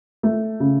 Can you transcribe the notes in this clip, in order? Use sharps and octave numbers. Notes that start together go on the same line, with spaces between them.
A3
C#3